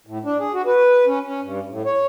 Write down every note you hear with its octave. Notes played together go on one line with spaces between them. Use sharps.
A2
D4
G#4
F#4
B4
C#4
C#4
G2
A2
C#5